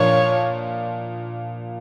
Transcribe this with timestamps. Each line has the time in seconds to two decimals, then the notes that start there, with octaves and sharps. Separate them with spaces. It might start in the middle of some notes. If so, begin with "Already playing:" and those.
Already playing: A#2 F3 A#3 D4 F4 C#5